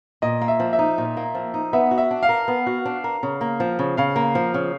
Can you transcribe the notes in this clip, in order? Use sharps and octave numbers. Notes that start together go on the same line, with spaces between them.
A#2 D#5
A#3
E5
F3
E5
D#4
A#2
A#3
F3
D#4
B3 E5
F#4
E5
D4
F5
A#4
B3
F#4
D4
A#4
C#3
A#3
F3
C#3
C#3 F5
A#3
F3
C#3